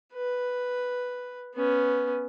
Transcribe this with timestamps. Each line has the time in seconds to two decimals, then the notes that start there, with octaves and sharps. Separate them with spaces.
0.13 B4
1.55 B3 C#4